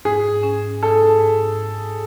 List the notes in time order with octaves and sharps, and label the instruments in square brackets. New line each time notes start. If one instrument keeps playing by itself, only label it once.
[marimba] G#2 [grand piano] G#4
[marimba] C#4
[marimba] G#2 [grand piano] A4
[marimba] G#2